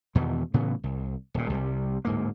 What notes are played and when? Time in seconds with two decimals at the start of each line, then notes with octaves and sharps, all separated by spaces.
0.15 E2 B2 D#3 E3
0.54 A2 C#3 E3 B3
0.83 C2
1.34 D#1 A#2
1.50 C2 C3 F#3 G3
2.05 D1 G#2 A#3